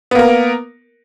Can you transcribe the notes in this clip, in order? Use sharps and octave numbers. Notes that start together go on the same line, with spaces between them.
A#3 B3 A#4